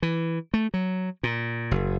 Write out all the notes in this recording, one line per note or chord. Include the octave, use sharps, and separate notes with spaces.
E3
A3
F#3
A#2
F#1